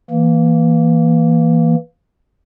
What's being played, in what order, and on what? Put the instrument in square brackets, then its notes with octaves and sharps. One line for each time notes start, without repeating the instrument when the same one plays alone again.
[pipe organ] E3 A#3